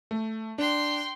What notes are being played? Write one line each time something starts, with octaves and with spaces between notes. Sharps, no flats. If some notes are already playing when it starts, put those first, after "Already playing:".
A3
D4 G5 C6